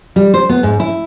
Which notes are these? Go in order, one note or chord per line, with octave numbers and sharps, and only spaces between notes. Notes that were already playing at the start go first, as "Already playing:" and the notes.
G3
C5
B3
G#2
E4